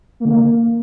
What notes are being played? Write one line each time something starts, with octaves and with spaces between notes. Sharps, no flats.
A#3
D3
A#3